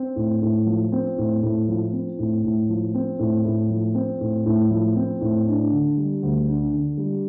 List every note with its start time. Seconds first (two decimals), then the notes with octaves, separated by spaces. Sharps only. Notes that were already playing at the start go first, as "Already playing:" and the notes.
Already playing: C4
0.16 A2
0.42 A2
0.66 F3
0.92 C4
1.18 A2
1.42 A2
1.69 F3
1.93 C4
2.19 A2
2.44 A2
2.69 F3
2.94 C4
3.19 A2
3.45 A2
3.70 F3
3.94 C4
4.20 A2
4.46 A2
4.71 F3
4.96 C4
5.21 A2
5.47 D4
5.72 D3
5.97 G3
6.22 D2
6.47 D4
6.73 D3
6.97 G3